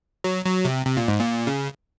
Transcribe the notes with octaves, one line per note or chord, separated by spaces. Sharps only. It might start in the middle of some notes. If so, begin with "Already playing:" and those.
F#3
F#3
C3
C3
A#2
G#2
A#2
C#3